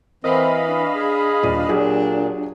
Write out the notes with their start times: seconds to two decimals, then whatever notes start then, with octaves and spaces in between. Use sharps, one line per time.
0.24 E3 C4 A#4 D#5 F5 B5
0.68 D4
0.96 G#4
1.43 D#1 D4 D5 D#7
1.69 A#2 F#3 G4 G#4